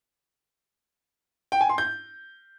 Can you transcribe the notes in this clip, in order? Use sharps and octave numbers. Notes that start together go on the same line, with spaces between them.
G5
G#5
C6
G6